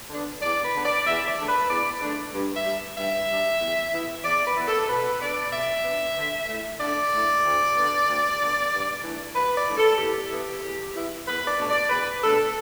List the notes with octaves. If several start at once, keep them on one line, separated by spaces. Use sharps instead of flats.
D3 B3 D4
E2 D5
B4
D3 B3 D4
D5
E2 E5
D5
D3 A3 D4
B4
E2 D5
D3 A3 D4
G2
E5
G3 D4
G2 E5
G3 D4
E2
E3 B3 E4
E2 D5
B4
E3 B3 E4
A4
B2 B4
B3 D4 D5
B2 E5
B3 D4
D3
A3 E4
D3 D5
A3 E4
D2
D3 B3
D2
D3 B3
G2
E3 A3 D4
G2 B4
D5
E3 A3 D4
A4
E2 G4
E3 B3 E4
E2
E3 B3 E4
E2 B4
D5
B2 A3 D4
D5
E2 B4
B2 A3 D4 A4